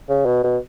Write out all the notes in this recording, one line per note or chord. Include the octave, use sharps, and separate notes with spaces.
C#3
B2
B2